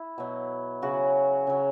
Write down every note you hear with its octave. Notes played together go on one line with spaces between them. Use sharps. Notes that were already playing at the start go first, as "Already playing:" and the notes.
Already playing: E4
B2 F#3
C#3 F#3 F#4
C#3 F#3